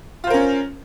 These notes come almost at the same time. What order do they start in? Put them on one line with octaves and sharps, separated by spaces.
F4 C5 A#4 C#4